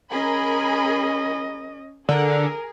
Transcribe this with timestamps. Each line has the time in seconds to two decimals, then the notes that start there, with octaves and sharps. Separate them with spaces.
0.11 C#4 G#4 A#4 D#5 B5
2.09 D3 G#4 A#4